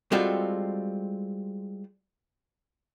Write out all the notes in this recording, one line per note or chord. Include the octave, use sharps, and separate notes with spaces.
G3 G#3 C4 F4 F#4 A4